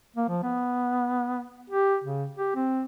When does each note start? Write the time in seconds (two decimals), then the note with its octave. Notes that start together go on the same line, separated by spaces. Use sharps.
0.16 A#3
0.29 F3
0.43 B3
1.70 G4
2.04 C#3
2.38 G4
2.55 C4